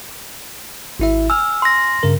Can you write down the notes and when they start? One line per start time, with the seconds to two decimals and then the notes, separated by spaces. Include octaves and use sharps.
0.99 G#1 E4 E5
1.30 G#5 E6 F6
1.62 C6 A#6
2.03 G2 C#3 A#4